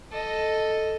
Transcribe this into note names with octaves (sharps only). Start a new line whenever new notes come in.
A4 D#5